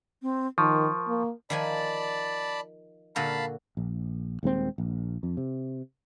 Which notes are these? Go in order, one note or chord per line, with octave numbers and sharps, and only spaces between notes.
C4
D#3 F3 A#4 C#6
A#3
D#3 F3 D5 G#5 A5 B5
A#2 D3 F#4 F5 A5 B5
A#1
D#1 D#2 G#3 C4
A#1
F2
C3